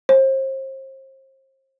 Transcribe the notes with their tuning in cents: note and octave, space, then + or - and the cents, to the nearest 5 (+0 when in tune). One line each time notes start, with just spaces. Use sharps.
C5 +35